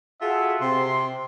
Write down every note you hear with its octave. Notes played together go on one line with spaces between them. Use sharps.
F4 F#4 G#4 A4 E5 F#5
C3 C6